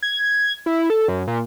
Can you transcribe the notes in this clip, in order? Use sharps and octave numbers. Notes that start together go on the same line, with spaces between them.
G#6
E4
A4
F#2
A#2